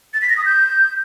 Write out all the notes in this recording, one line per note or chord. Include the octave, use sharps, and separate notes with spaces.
A6
B6
A#6
D#6
G6